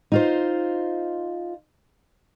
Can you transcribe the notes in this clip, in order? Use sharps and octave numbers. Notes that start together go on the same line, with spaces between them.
D#4 F4 C5